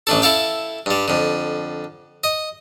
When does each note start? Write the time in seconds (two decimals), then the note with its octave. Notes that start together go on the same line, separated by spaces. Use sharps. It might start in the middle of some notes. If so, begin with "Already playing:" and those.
0.07 A1 A3 D4 A4
0.22 E4 A4 F5 G5
0.86 G2 G3
1.08 F2 D3
2.24 D#5